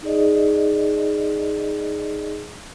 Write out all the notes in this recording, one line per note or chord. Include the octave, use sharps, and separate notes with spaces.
D#4 G#4 D5 D#5